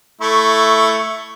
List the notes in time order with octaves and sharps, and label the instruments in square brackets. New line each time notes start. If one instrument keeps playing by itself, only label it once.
[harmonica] A3 E4 C#6